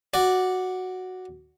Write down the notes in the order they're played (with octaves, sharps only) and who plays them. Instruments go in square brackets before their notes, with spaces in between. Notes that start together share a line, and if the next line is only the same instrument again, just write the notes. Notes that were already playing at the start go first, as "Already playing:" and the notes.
[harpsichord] F#4 D5